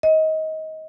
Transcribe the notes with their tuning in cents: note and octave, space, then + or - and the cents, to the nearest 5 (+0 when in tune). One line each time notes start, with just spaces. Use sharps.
D#5 +25